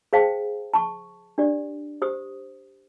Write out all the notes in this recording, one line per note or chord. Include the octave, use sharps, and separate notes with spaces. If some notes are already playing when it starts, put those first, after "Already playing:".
G#4 C5 F5 G5 A5
A5 C#6
D4 G4 D5
G4 C5 D#6